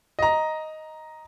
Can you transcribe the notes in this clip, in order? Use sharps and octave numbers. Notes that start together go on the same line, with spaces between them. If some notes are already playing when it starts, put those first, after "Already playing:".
D#5 A#5